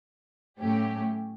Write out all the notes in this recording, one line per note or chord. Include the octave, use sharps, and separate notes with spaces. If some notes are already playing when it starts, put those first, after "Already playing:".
A2 F#3 A3 C#4 G4